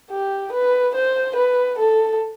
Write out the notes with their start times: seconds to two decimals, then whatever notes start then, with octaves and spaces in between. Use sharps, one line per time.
0.11 G4
0.52 B4
0.95 C5
1.36 B4
1.78 A4